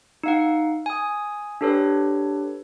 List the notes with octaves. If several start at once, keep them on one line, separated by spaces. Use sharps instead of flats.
D#4 F5 F#5
G#5 D#6
D4 G4 A4 B4 C#5